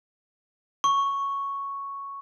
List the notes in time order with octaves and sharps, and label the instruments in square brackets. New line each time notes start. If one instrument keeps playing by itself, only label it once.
[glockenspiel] C#6